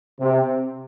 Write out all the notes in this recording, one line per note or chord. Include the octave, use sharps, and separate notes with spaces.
C3